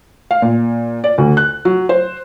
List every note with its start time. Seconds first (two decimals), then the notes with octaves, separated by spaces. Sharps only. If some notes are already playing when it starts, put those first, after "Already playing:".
0.31 F5
0.42 A#2
1.04 D5
1.18 D2
1.37 F#6
1.65 F#3
1.89 C5